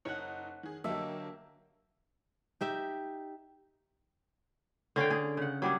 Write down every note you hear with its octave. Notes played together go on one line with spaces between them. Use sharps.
F#1 D#4 C#5 F#5
D#3 G#4
D3 F#3 A#3 G4 A4 E5
D#4 G4 E5
D3 C#4 F5 G5
G#4
C#3 F#5
F#3 G3 D4 G#4